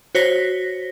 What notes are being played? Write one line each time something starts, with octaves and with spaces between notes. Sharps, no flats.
F#4 C5 C#5 A#6 B6